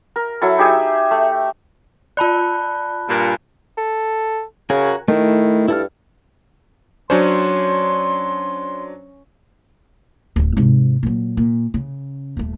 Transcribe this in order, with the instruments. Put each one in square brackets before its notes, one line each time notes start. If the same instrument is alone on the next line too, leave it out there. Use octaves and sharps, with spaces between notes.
[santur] A#4
F#3 E4 A4
D#4 G4 G#4 E5
A3
[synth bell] F4 D5 [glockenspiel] A5 B5 F#6
[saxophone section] G2 A#2
[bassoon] A4
[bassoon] C#3 [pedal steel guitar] F#4 A#4 G#5
[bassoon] D#3 [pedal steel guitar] A3 E4
[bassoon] G2 [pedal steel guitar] E4 A4 F6
[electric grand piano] F#3 D4 C5 [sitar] C#4 [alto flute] C6
[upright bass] D1 C4
G#2 C3
A#2 F#3
A#2
C#3
D#1 A3